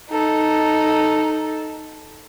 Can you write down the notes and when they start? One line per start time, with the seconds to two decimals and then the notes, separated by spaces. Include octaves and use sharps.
0.10 D#4 A4